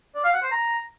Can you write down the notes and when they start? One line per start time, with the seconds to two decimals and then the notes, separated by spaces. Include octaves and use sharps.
0.15 D5
0.24 F5
0.33 F#5
0.42 C5
0.51 A#5